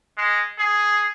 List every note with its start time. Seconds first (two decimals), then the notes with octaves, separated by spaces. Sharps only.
0.18 G#3
0.58 G#4